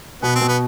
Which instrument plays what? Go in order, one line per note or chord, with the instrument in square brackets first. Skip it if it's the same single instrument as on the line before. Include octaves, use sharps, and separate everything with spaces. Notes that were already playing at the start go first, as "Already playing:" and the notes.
[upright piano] B2 [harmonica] B3
[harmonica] C4
[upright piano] B2
[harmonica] B3